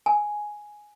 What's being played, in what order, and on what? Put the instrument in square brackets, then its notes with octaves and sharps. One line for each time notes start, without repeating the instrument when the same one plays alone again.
[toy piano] G#5